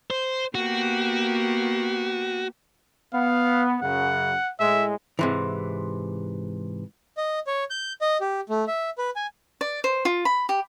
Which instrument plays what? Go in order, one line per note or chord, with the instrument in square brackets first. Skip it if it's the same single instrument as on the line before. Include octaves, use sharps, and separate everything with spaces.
[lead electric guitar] C5
[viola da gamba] A#3 B3 G4 [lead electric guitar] F#4
[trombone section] B3 [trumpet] F5
[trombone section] F#2 C#3 [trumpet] F#5
[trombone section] A2 G#3 [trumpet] E5
[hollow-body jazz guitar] G#2 C3 E3
[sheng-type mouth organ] D#5
C#5
G6
D#5
G4
A3
E5
B4
G#5
[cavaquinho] D5
C5
F4
B5
G4